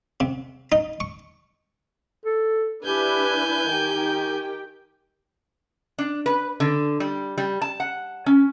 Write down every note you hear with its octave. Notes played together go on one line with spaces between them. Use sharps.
C3
D#4
C#6
A4
D4 E4 G4 B4 G#5 G6
D#3 D#4 G4 G5
D4
B4
D3
G3
G3
A5
F#5
C#4